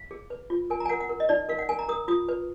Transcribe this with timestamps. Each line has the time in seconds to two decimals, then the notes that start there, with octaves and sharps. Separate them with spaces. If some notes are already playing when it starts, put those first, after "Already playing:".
Already playing: F5
0.11 G#4
0.30 B4
0.50 F4
0.70 A#4 G#5
0.80 A#5
0.85 G#5
0.89 A#4 F#5
1.00 F#5
1.09 A#4
1.20 D#5
1.29 D#4 D5
1.49 A#4 F5
1.59 F#5
1.69 A#4 G#5
1.79 A#5
1.89 A#4 D#6
2.08 F4 D#6
2.28 B4